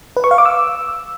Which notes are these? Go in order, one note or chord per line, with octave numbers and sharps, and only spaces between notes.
B4
C#6
F5
D6
E6